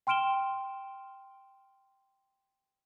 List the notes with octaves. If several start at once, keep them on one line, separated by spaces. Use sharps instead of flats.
G5 C6 F6 D7 E7 G7